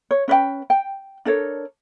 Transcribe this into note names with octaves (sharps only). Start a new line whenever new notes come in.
C#5
C#4 B4 D5 G5
G5
D4 A4 A#4 C#5